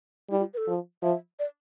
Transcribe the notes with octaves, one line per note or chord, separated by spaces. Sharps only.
G3 E4
F4
B4
A4
F3
F3 E5
D5